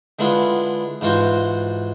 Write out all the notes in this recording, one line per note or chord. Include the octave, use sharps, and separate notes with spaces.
D3 G#3 B3 E4 F4
G#2 E3 F4 F#4 C5